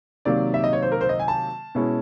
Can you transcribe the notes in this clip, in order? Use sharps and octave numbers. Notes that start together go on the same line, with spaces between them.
C3 D#3 F#3 A#3 D5
E5
D#5
C#5
C5
A#4
C5
D#5
G#5
A5
B2 G#3 C#4 E4